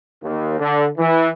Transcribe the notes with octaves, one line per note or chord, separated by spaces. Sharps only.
D#2
D3
E3